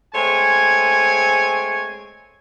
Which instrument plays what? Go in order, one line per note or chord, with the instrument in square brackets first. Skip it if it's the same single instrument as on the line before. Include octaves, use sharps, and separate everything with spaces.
[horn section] G#3 A3 C4 C#5 G#5